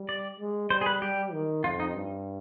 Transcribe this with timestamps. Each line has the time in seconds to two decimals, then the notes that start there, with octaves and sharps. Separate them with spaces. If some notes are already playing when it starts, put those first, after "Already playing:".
Already playing: G3
0.09 D5
0.39 G#3
0.70 G3 C5
0.81 G#4
0.86 B4
1.02 G3 G4
1.32 D#3
1.64 F2 F4
1.80 D#4
1.95 G2